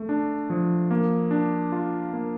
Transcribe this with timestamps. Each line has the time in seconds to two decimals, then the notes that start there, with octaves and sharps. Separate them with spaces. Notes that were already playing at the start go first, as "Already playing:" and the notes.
Already playing: A3
0.09 D4
0.50 F3
0.91 A#3
1.31 D4
1.72 F4
2.13 A#3